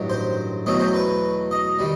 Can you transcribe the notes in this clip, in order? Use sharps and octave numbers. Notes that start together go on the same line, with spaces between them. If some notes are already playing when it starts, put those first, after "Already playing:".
Already playing: A1 G2 D#3 F#3
C5
E2 B2 F#3 A3 D#5
C5
B4
D#5
D#3 G3